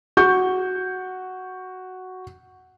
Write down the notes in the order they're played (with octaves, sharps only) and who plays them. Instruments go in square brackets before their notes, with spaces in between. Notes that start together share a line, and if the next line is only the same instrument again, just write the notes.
[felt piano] F#4 C#6 G6